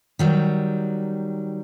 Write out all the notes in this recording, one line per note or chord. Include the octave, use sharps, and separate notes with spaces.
D#3 F#3 G3